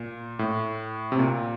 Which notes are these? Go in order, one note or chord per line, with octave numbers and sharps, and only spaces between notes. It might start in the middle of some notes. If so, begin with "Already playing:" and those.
Already playing: A#2
A2
C3
A#2